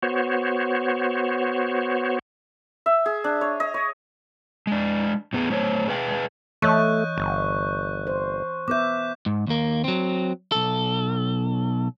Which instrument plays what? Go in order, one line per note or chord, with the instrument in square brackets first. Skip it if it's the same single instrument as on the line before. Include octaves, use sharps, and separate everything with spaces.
[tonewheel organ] B3 F#4 C5 C#5
[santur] E5
G#4
D4
C#5
D#5
C#5
[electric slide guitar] G#3 D4
A2 B3 G#4
A3 C5 C#5
G#4 B4 F5 G5
[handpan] E3 C#5 D#5 [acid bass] A3 [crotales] C#6 F#6 G6
[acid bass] G1
[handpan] C5
[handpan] B3 B4 E5 [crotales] D6 G6
[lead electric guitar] G#2
D#2 A#3
F#3 C4
B1 A4